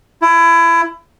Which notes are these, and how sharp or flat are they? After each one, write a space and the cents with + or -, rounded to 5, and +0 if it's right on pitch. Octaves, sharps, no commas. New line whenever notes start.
E4 +25